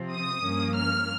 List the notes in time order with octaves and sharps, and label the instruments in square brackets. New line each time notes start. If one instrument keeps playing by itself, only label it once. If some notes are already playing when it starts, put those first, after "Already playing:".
Already playing: [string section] C3 F3 C4
D#6
G2 F3 A#3 C#4
F6